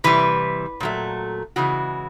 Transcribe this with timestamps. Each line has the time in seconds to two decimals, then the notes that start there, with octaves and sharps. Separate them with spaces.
0.04 C3 E3 G3 B4
0.80 A#2 F#3 A3
1.56 C#3 E3 G#3 F#4